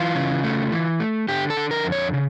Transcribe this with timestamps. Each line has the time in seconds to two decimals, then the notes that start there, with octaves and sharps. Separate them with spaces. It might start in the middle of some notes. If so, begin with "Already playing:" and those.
Already playing: E3 F4
0.15 C#3
0.44 A3
0.72 E3
1.00 A3
1.28 D3 G4
1.50 A4
1.57 D3
1.71 A#4
1.85 F2
1.92 C#5
2.14 C#3